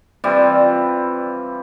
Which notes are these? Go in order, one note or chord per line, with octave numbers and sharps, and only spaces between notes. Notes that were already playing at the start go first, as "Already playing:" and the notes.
E3 G3 C4 F4